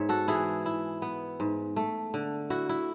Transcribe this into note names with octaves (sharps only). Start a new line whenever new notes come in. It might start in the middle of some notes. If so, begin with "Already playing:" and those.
Already playing: G#2 B3 C#5 E5
F#4 A4
E3 E4 G#4
E4
B3
G#2
A3
D3
E4 F#4
E4